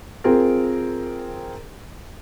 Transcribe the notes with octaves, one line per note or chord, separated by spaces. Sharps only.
C4 F4 G#4 A#4